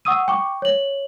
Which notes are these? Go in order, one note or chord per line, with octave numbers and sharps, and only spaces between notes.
F#5 C#6 D#6 E6 D#7
G5 C#6 D6
C#5 F#7